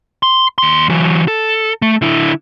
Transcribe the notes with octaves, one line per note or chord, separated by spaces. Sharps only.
C6
D#2 C6
E3 F#3
A4
A3
D3 E4